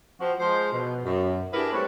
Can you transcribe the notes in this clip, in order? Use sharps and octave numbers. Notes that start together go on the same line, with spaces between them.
F3 C4 F#4
F3 G#3 C5
B2
F#2
D4 E4 G4 G#4 A#4 B4
G3 A3 C4 B4 C#5